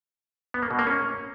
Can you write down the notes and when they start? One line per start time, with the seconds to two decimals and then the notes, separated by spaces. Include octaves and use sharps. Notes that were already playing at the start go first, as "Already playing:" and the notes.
0.54 B3
0.62 A#3
0.71 B2
0.79 A#3
0.87 C#4